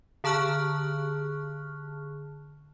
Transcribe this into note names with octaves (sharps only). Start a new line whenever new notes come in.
D3 G#4 A5 C#6 F6 F#6